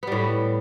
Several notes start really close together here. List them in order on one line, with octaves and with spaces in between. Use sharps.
B3 G3 A2